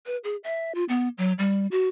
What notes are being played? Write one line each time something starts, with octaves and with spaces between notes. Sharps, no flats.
B4
G#4
E5
F4
B3
F#3
G3
F#4